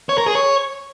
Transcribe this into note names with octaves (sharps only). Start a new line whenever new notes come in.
C#5
A#4
G#4
C#5